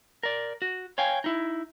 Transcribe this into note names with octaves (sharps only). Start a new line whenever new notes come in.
A#4 D5
F#4
C#5 F5 G5 G#5
D#4 E4